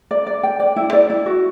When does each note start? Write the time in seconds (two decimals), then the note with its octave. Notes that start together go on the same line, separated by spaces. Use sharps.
0.11 D5
0.27 D5
0.43 G5
0.60 D5
0.76 E4
0.93 D5
1.10 E4
1.26 F#4